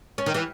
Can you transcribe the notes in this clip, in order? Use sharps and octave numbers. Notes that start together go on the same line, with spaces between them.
C#4
D#3
E3